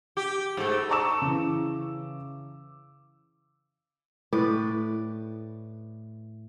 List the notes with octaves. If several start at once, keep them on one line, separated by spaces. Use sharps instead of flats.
G4
G#2 A3
A5 A#5 C#6 D6 E6 E7
C#3 E3
A2 B4 D5